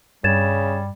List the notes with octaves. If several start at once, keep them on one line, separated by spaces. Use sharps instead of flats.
G2 C#3 G3 G#6 A6 E7